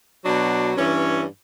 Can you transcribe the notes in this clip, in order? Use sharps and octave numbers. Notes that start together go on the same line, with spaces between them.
B2 F#3 D4
G2 E3 C#4